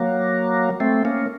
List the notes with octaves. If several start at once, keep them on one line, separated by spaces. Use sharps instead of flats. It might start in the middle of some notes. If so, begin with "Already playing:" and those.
Already playing: F#3 A#3
A3 C4
A#3 C#4